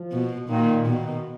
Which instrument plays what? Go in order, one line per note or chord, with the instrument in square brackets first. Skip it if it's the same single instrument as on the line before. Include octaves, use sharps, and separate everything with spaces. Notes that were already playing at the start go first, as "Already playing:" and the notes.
Already playing: [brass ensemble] F3
[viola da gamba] B2
[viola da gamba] A#2 [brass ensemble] D#3
[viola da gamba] B2 [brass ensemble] D#3